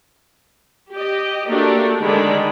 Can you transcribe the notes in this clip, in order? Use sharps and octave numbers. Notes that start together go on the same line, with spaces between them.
G4 D#5
A3 A#3 D4 F#4 G4
D3 D#3 G#3 D4 B5